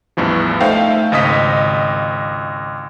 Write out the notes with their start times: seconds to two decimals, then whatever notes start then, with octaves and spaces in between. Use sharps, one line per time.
0.17 A1 E2 G2 E3 F3
0.60 A3 D#4 C5 E5 F5 G5
1.12 G#1 C#2 D#5 D#6 B6